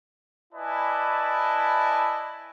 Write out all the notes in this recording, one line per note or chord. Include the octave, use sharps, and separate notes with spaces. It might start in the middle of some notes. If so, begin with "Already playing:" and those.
E4 B4 D5 D#5 G#5 A5